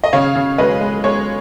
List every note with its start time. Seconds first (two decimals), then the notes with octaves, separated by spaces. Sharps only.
0.04 D#5
0.13 C#3 C#5 F5
0.36 C#3
0.58 G#3 B4 D#5
0.81 G#3
1.04 G#3 C#5